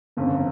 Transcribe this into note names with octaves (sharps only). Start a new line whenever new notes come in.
G1 F2 C#3